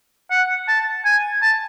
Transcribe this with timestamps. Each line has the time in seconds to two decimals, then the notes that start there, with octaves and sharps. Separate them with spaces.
0.30 F#5
0.68 A5
1.05 G#5
1.42 A5